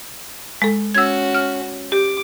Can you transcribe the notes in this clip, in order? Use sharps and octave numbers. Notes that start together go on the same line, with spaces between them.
G#3 A4
C#4 F#4 E6 G#6
F6
G4 D6